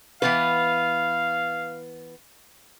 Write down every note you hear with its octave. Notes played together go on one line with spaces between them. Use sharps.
E3 B3 B4 F5